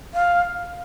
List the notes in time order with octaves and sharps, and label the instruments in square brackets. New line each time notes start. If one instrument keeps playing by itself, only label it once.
[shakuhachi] F5